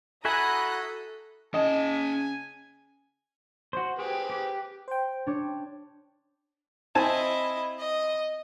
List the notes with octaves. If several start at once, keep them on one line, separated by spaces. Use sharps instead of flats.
E4 F#4 A4 E5 G#5 A#5 D#6 F#6
C#3 C#4 D#5 G#5 A5
F#4 C5
C4 G4 G#4 B4
G4
C5 G5
D4 C#5
C4 E4 D#5 G#5 A5
D#5